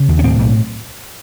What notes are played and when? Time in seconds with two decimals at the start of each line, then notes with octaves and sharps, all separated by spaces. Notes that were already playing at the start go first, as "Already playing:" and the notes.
Already playing: C#3
0.09 D#2
0.19 C#4
0.24 A2 C4
0.39 B1